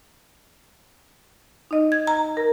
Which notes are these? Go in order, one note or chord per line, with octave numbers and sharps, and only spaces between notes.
D#4 D#5
G#6
A#5
A#4